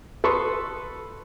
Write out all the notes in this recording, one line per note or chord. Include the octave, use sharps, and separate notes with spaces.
A4 B4 C6 C#6 D#6